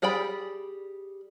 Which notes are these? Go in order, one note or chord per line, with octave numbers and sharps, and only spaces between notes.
G3 G#4 D5 G5 B5